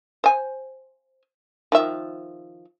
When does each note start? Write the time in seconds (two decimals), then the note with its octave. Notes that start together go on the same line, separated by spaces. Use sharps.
0.24 C5 G#5
1.72 D#3 F3 E5